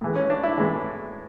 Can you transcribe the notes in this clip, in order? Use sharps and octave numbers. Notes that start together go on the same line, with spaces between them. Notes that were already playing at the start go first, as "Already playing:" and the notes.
A2 E3 G#3
C#4
D4
E4
A2 E3 G#3